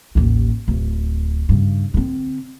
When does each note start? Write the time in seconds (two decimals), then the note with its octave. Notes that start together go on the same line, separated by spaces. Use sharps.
0.15 A1 D#2
0.68 D1
1.49 G2 C#3
1.94 D3 C4